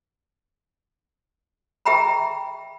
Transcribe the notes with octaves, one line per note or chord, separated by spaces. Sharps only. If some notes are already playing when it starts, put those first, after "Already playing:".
G#4 E5 G5 A#5 B5